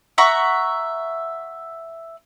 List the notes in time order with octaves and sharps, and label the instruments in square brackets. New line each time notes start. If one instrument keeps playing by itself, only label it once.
[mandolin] E5 F#5 A#5 C#6